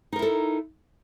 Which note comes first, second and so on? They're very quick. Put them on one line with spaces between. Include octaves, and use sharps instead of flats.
D#4 A#4 E4 A4